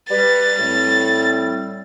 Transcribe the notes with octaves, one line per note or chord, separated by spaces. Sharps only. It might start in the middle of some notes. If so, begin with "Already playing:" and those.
G3 B4 A6
A2 G3 C4